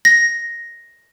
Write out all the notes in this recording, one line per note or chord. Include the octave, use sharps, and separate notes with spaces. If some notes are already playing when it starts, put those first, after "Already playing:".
A#6